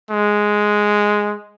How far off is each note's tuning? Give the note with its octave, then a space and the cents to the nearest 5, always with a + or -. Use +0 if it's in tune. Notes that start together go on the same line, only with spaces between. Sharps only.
G#3 +0